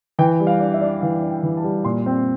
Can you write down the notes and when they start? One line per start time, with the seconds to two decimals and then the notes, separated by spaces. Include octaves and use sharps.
0.19 E3 G5
0.40 G3
0.47 F5
0.60 D4
0.74 E5
0.81 D4
1.01 E3 F5
1.23 D4
1.30 G5
1.43 E3
1.57 A5
1.64 G3
1.85 A#2 C6
2.06 C4